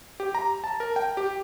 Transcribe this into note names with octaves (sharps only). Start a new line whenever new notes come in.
G4
A#5
A5
A#4
G5
G4